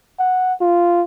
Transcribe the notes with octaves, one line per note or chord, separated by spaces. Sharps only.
F#5
F4